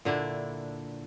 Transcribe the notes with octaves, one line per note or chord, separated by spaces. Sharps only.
A#2 D3 D4 E4